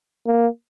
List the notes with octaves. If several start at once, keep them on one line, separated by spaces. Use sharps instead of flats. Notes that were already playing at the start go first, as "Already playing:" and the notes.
A#3